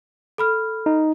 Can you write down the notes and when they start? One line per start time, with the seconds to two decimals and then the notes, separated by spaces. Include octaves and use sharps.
0.38 A4 B5 F6
0.86 D#4